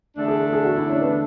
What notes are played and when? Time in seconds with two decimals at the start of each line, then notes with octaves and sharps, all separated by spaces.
0.16 E2 D3 A3 D4
0.28 G#4
0.41 A4
0.53 G#4
0.64 F#4
0.77 E4
0.89 C#4
1.01 B3